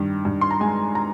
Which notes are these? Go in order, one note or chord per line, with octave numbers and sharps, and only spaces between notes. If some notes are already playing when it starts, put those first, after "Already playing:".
Already playing: G2 D#3
G2
C6
A#5
G#3 G#5
A#5